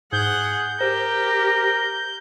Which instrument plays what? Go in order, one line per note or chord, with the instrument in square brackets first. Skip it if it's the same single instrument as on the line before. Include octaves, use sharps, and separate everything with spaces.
[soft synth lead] G#2 [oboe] G#4 [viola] F#5 [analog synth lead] G6
[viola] G4 [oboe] A#4 [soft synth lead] C5